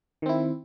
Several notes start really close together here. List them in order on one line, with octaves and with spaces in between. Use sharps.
D#3 C4 E4